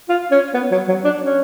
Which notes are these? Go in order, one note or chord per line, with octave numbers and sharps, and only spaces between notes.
F4
C#4
B3
F#3
F#3
D4
C#4